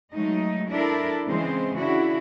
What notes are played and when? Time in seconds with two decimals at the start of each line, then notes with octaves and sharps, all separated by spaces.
0.13 F#3 G#3 A3 D#4
0.69 D4 E4 A4 A#4
1.27 C#3 E3 G#3 C4 C5
1.78 C#3 D4 E4 F#4